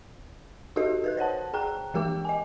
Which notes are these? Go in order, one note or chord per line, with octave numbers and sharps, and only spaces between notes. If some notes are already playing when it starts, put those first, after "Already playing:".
D#4 F#4 G4 A4 A#4 D#5
A#4 B4 F#6
C5 C#5 F#5 A5
G#4 G5 A#5 F#6
E3 G#3 G4 A#4 G5 D6
D#5 G#5